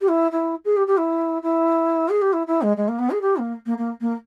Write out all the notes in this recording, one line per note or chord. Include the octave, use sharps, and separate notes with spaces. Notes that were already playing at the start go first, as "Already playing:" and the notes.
G4
E4
E4
G#4
G4
G4
E4
E4
G#4
G4
E4
E4
G#3
G#3
A#3
B3
G#4
G4
A#3
A#3
A#3
A#3